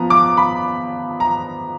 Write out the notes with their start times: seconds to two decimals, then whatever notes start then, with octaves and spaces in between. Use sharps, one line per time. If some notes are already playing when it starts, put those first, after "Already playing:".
Already playing: F3 B3 A#5
0.10 D6
0.37 B5
1.20 A#5